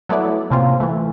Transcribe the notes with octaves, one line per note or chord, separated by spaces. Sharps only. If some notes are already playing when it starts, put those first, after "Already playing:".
F#3 A3 B3 E4 D5
A2 C3 A#3 C4 C#4 F4
E3 A3